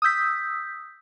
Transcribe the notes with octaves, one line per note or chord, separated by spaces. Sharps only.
D#6 E6 G6 B6